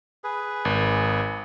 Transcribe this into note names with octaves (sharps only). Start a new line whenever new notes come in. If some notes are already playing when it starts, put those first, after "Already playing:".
G#4 B4
G#1